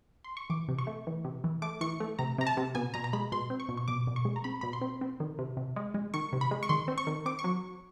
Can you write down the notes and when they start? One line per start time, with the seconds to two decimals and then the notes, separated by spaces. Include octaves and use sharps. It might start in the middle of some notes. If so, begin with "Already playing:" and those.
0.24 C6
0.37 C#6
0.50 E3 D6
0.68 C3
0.78 C#6
0.87 A3
1.07 E3
1.25 C3
1.44 E3
1.62 A3 D6
1.81 E3 C#6
2.00 A3
2.19 C3 A#5
2.38 C3 A#5
2.47 A5
2.57 C3
2.75 B2 G#5
2.94 B2 A#5
3.04 A#5
3.13 G#3 B5
3.32 B2 C6
3.50 C4
3.60 C#6
3.69 B2
3.77 C#6
3.88 B2 D6
4.07 B2
4.16 C#6
4.25 G#3
4.36 A#5
4.44 C4 B5
4.61 B2 B5
4.73 C6
4.81 C4
5.01 C4
5.20 D#3
5.39 C3
5.57 C3
5.76 G#3
5.94 G#3
6.14 D#3 C#6
6.33 C3
6.41 B5
6.51 G#3
6.63 C#6
6.69 D#3 C6
6.88 C4
6.98 C#6
7.07 D#3
7.26 C4 D6
7.39 C#6
7.44 F#3